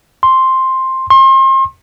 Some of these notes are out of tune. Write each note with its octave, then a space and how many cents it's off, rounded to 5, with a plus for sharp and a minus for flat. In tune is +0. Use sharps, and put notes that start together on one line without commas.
C6 +5
C6 +35